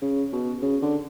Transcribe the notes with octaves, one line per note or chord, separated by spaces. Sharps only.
C#3
B2
C#3
D3